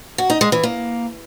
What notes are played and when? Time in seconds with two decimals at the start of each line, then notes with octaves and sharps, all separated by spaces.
0.18 F#4
0.30 D#4
0.41 G#3
0.52 E3
0.63 A#3